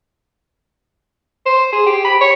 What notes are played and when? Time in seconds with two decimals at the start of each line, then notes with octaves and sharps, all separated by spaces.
1.46 C5
1.73 G#4
1.86 G4
2.05 B5
2.21 C#5